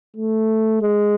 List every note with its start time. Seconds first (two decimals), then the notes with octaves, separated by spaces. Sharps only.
0.16 A3
0.82 G#3